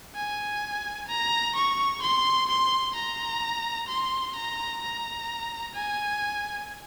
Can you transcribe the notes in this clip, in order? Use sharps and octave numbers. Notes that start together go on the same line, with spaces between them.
G#5
A#5
C#6
C6
C6
A#5
C6
A#5
A#5
G#5